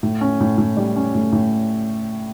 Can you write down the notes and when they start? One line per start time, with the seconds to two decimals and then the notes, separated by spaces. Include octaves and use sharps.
0.03 A2
0.21 C#4
0.40 A2
0.58 A2
0.77 G3
0.96 C#4
1.15 A2
1.32 A2